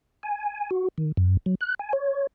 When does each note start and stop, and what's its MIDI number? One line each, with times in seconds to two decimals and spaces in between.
0.23 0.70 80
0.71 0.88 66
0.98 1.12 51
1.17 1.37 42
1.46 1.55 54
1.61 1.75 90
1.79 1.93 80
1.93 2.27 73